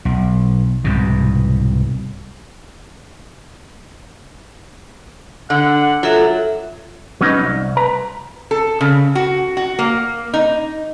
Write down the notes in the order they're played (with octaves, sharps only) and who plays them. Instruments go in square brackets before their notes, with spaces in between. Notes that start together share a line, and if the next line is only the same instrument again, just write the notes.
[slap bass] B1
C2 G#2 B2
[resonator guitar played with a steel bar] D3 [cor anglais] F#5
[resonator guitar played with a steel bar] F#3 [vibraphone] F4 A4 E5
[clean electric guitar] F#3 B3 C#4 D#4
C2
B4 A#5
[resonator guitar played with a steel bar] A4
C#3
F#4
F#4
A#3
D#4